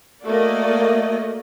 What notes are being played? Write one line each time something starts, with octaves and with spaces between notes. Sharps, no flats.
A3 A#3 F#4 D5 D#5